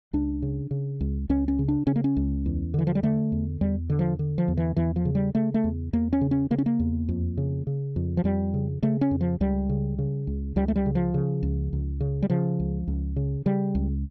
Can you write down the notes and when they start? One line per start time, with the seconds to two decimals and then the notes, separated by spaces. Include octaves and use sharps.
0.13 C#2 D4
0.42 C#3
0.71 C#3
1.01 C#2
1.29 C#2 C#4
1.48 C#4
1.59 C#3
1.68 D4
1.87 C#3 C#4
1.96 A#3
2.04 C#4
2.16 C#2
2.46 E2
2.74 D3 E3
2.87 F3
2.95 G3
3.03 D3 A3
3.32 E2
3.61 E2 G3
3.90 D3
3.99 F3
4.19 D3
4.38 F3
4.48 E2
4.57 E3
4.76 E2 E3
4.96 F3
5.05 C#3
5.15 G3
5.35 C#3 A3
5.54 A3
5.64 E2
5.93 E2 A#3
6.13 C#4
6.21 C#3
6.31 C#4
6.50 C#3 A#3
6.58 C#4
6.66 A#3
6.80 E2
7.09 F2
7.37 C#3
7.67 C#3
7.96 F2
8.17 F3
8.24 F2 G3
8.54 C#3
8.82 C#3 A3
9.01 C#4
9.11 F2
9.21 F3
9.40 C#2 G3
9.69 C#3
9.99 C#3
10.27 C#2
10.56 C#2 G3
10.68 A3
10.76 G3
10.86 C#3
10.95 F3
11.14 C#3
11.43 C#2
11.73 C#2
12.01 C#3
12.22 G3
12.30 C#3 F3
12.60 C#2
12.87 C#2
13.16 C#3
13.46 C#3 G3
13.75 C#2